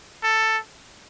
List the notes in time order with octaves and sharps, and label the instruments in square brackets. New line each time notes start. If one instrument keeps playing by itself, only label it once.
[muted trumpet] A4